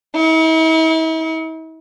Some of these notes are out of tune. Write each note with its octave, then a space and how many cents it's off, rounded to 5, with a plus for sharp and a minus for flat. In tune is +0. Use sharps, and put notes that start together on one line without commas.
E4 -45